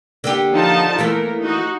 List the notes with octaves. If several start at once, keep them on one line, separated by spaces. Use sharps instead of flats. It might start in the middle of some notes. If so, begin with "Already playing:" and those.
D3 A#3 G4
F3 D#4 A5
E3 A3 A#3 A#4
D#4 F#4